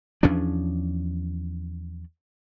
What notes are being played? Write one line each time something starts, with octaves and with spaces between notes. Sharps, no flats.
E2 F3 C#4 D4